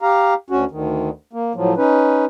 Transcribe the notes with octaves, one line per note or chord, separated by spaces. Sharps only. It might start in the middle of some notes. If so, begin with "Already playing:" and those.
G4 F5 A#5
D2 C#4 F#4
D2 D#3
A#3
A2 F3 F#3
C#4 D#4 B4